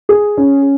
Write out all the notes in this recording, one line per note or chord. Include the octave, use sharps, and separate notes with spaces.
G#4
C#4